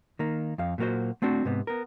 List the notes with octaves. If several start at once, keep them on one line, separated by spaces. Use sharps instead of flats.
D#3 A#3
F2 F5
A#2 F#3 A#3 F#4 C5
A3 C4 D4 F#4
G#2 C3 B3
B3 A#4